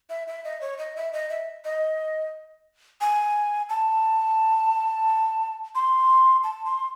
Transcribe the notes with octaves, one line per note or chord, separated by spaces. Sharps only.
E5
E5
D#5
C#5
D#5
E5
D#5
E5
D#5
G#5
A5
C6
A5
C6